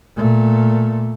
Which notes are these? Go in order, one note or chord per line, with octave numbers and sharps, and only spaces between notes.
A#2 A3